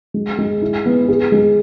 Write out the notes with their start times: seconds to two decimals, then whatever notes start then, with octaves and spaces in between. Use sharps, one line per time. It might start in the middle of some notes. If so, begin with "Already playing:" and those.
0.14 G#3
0.39 G#3
0.62 E4
0.86 B3
1.09 G#4
1.32 G#3